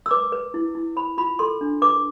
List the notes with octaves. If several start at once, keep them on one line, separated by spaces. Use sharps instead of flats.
E6
B4 D6
B4
E4
E4
C5 B5
F4 B5
A4 C6
D4
B4 D6